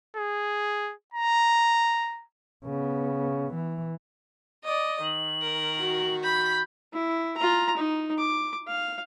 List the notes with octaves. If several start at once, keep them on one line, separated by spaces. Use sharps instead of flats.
G#4
A#5
C#3 B3
E3
D5 D#5
D#3 F#7
A#4
F#4
B5 G6 B6
E4
F4 A#5
D#4
D6
F5